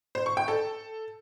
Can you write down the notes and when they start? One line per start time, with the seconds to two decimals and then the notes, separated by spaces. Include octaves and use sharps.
0.15 C5
0.26 C#6
0.37 G5
0.48 A4